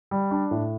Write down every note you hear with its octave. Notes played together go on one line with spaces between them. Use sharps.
G3
D4
A2